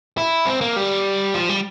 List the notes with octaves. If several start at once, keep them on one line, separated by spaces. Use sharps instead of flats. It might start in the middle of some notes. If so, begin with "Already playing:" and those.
E4
C4
A#3
G3
F3
G3